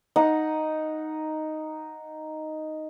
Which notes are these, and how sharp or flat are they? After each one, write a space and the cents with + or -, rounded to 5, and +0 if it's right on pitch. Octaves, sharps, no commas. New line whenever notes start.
D#4 +0 F#5 -10